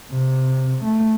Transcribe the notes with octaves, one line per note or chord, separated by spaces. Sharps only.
C3
A3